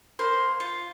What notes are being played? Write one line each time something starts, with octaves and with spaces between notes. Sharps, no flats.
A#3 C5 C6
F4